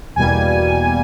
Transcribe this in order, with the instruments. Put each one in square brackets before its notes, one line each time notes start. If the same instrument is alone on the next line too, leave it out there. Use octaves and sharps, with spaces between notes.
[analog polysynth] E2 B2 G3 A#3 G#5